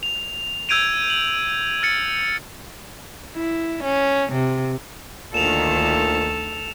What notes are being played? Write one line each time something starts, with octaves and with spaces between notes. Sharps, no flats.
F7
E6 G6 G#6 D7 D#7 F7
F#7
F6 A6 C#7
E4
C#4
C3
D2 A#2 D#3 A4 E7 F7